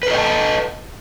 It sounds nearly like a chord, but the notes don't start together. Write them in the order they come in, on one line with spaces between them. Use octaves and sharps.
B4 A4 D#5 G5 A5